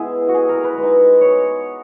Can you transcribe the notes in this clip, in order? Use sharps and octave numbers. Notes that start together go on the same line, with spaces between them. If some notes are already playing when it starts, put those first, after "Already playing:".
Already playing: G#3 B3 E4 G#4
F#4
G#4
A#4
B4
G#3
D#4
C#5